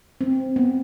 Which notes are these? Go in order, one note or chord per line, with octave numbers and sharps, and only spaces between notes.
C4
B3